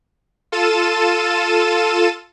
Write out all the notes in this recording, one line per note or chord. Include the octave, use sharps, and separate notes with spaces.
F4 A4 A6 D#7 E7